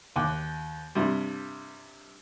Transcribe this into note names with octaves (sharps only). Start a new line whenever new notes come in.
D#2 G5 D6 F#6
G2 C3 G3